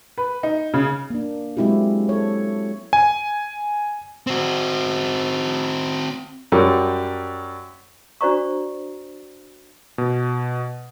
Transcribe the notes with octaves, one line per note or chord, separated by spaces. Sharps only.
B4
D#4
C#3
A#3 D4
F#3 G#3 C4 E4 F#4 G4
A4 C#5
G#5
C4 F#4
F#2 F#3 G3
D4 F#4 C5 D5 A#5 C#6
B2